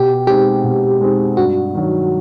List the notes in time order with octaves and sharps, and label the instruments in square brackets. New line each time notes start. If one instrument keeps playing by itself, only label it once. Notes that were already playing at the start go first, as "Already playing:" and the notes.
Already playing: [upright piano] B2 [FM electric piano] G4
[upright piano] G#3 C4 D#4 [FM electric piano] G4
[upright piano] B2
G#3 C4 D#4
[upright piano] G2 [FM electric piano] F#4
[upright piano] D#3 F#3